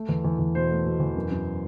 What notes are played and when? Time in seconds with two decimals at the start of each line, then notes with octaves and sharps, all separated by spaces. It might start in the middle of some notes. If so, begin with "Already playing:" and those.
Already playing: A3
0.09 E2
0.24 E2
0.39 E2
0.55 B2 C5
0.70 A3
0.86 B2
1.00 E2
1.16 F#2
1.31 F#2